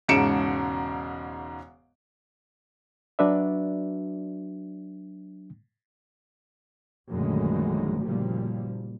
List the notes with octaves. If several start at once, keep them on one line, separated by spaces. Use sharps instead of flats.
E1 G#2 C#3 C#7 D7 E7
F#3 D4 F#4 B4 D5 E5
A#1 F#2 D3 D#3 G#3 A3
F#1 A#2 F3 G3